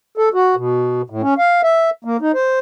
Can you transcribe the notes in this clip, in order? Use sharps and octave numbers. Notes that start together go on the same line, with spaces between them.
A4
F#4
B2
A2
C#4
F5
E5
A#3
D#4
C5